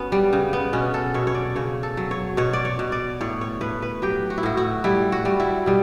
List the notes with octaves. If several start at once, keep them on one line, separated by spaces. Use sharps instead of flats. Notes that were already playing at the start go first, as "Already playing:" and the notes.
Already playing: F#3 B3 C#4
G3
C#3
B3
B2 C#4
A4
B2 C#5
C#5
D5
C#3 C#5
A4
F#3
C#5
B2 C#5
D5
C#5
B2
D5
A2 C#5
C#5
A2 B4
B4
F#3 G4
F#4
E4
A2 F#4
F#4
G3 E4
F#4
G3
E4
B2 G3